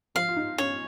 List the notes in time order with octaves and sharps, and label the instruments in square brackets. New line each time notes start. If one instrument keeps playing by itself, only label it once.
[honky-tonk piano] F3 [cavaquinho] F5
[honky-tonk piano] F4
D#4
[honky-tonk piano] C#4 [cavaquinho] C#5